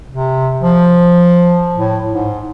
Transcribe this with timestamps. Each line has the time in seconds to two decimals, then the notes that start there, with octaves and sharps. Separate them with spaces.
0.09 C3
0.61 F3
1.76 A2
2.11 G#2